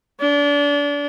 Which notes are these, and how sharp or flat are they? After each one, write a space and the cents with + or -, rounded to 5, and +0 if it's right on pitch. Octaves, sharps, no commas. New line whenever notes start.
D4 -30